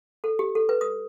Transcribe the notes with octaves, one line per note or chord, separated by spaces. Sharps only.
A4
G4
A4
B4
D#6